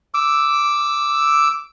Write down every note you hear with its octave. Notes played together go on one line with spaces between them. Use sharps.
D6 E6